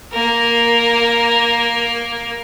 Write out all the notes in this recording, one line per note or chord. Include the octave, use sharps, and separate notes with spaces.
A#3 A#4